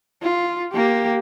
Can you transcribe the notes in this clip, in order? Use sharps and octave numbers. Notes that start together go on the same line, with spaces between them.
F4
A#3 G4